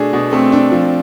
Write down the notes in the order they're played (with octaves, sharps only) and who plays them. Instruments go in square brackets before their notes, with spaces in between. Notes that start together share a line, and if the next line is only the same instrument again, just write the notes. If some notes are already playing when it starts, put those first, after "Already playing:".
Already playing: [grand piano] B2 A3 D4 G#4
B2
[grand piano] A3 [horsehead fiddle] C4
[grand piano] D4
F3